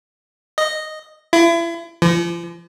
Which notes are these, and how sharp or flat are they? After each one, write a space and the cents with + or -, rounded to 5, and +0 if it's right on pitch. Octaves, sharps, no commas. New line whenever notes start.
D#5 -5
E4 +35
F3 -40